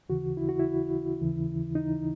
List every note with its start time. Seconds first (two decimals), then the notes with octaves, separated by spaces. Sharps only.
0.09 D#2 C#3 E3 F#4
0.37 E4
0.49 F#4
0.60 E4
1.20 D#2 C#3 E3
1.75 D#4